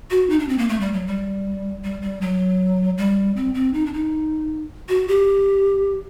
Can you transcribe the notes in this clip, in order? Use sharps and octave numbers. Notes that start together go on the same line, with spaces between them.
F#4
D#4
D4
C4
A#3
A3
G3
F#3
G3
G3
G3
F#3
G3
C4
C4
D#4
D4
D#4
F#4
G4